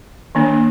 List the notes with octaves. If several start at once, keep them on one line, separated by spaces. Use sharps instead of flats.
D#3 A#3 D4